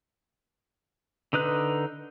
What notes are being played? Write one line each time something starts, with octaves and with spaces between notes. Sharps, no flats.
D3 D#4 B4 F#6